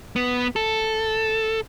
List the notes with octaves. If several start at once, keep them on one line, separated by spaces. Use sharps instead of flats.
B3
A4